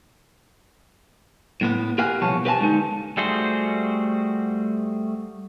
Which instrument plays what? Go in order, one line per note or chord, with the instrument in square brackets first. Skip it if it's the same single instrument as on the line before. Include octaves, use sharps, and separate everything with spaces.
[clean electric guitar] A2 A#3 B3
G4 A#4 B4 F5 F#5 G#5
C2 B2 F3 C#5 A5
G4 B4 F5 G#5 A5
D3 G#3 D4 D#4
[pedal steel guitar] G3 A3 F#4 G#4 C5